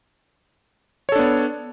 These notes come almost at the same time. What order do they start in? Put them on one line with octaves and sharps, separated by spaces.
C#5 A4 D4 B3